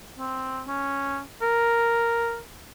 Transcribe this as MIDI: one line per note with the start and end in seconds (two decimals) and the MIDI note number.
0.19 0.62 60
0.67 1.19 61
1.42 2.40 70